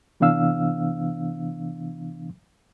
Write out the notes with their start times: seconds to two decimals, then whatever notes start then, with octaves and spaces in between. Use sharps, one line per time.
0.20 C3 E3 B3 D4 F5 E6